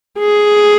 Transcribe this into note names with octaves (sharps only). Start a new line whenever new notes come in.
G#4